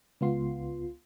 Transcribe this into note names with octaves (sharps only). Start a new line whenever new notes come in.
C#2 B3 F4 C6